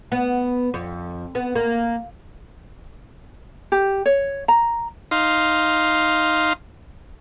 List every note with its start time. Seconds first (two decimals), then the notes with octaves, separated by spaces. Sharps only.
0.12 B3
0.74 F2
1.35 B3
1.55 A#3
3.72 G4
4.06 C#5
4.48 A#5
5.11 D#4 F5 C6